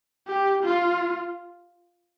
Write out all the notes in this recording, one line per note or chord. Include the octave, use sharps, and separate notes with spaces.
G4
F4